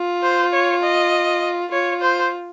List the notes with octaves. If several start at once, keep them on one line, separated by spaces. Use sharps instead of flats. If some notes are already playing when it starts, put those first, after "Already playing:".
Already playing: F4
C5
C#5
D#5
F4 C#5
C5